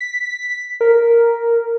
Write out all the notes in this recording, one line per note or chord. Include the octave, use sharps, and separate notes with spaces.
B6
A#4